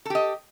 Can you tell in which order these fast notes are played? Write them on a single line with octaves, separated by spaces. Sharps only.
A4 G4 D#5